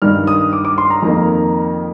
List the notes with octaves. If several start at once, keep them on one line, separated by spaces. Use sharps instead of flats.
G2 D#3 G3 F6
D#6
D6
D6
C6
A#5
F2 D#3 A#3